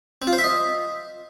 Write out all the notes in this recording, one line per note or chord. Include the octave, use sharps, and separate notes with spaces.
C4
F4
C5
E5
D#5